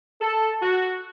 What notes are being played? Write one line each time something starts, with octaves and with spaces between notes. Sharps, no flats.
A4
F#4